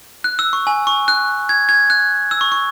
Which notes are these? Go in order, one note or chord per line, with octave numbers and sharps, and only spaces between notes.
F#6
E6
C#6
G#5
C#6
F#6
G#6
G#6
F#6
E6
C#6
C#6